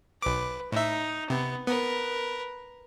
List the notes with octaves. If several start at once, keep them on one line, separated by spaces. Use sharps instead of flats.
B1 B4 D6
A2 D#4 E5
C3 B3
B3 A#4 B4